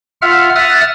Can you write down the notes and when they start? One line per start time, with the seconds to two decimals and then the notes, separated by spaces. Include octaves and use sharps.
0.22 F4 E5 F#5 F6
0.55 E5 F#5 D#6 F6 F#6 A6